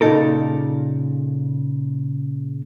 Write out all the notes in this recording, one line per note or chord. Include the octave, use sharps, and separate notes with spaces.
A#2 C#3 F3 D#4 A4 A#4